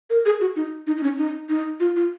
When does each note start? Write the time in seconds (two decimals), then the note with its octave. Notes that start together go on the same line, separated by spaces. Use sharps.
0.10 A#4
0.26 G#4
0.41 F#4
0.56 D#4
0.87 D#4
0.97 D#4
1.03 C#4
1.18 D#4
1.49 D#4
1.80 F4
1.96 F4